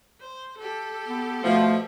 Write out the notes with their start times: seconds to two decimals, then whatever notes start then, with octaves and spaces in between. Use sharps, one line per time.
0.21 C5
0.58 G4 A4
1.06 B3
1.44 B2 F3 A3